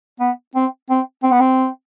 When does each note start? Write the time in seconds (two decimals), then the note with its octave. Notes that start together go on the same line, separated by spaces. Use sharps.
0.20 B3
0.55 C4
0.90 C4
1.23 C4
1.32 B3
1.40 C4